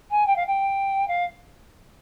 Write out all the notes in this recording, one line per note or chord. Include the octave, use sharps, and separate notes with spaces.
G#5
G5
F5
G5
F5